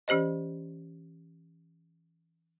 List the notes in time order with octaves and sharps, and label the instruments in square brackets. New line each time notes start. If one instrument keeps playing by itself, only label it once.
[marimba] E3 C#4 G4 C5 D#5